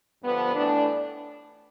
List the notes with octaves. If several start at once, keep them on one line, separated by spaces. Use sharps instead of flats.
G2 D3 F3 B3
A2 E3 A3 D4